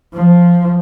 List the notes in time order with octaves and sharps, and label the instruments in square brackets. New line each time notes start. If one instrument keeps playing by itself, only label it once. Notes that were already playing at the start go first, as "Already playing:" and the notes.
[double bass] F3